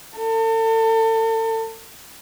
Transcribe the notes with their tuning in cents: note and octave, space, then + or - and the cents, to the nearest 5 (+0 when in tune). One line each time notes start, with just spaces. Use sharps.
A4 +35